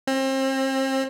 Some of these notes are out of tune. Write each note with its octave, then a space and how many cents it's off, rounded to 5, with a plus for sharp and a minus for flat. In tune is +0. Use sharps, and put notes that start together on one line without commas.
C4 +35